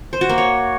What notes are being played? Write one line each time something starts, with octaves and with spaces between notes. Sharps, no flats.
C5
F#4
A#3
C#5